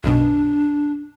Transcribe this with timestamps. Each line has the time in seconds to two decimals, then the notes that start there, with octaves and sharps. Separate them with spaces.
0.04 B1 F#2 B2 D4